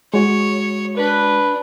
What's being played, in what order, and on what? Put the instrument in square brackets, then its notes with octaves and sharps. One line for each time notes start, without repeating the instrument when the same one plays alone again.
[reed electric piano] G#3 F#4 [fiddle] C#5
[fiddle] D4 [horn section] B4